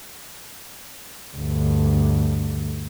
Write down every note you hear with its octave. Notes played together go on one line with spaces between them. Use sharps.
D2 G2